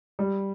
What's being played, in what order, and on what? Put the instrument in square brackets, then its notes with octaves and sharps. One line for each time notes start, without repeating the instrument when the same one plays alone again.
[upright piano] G3